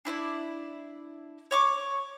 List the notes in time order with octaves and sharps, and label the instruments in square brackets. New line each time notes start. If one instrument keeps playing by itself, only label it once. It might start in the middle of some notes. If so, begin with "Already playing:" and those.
[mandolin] D4 E4 B4 D5
C#5 C#6 D6